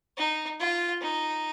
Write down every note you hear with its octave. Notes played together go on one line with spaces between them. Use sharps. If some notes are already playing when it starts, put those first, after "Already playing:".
D#4
F4
D#4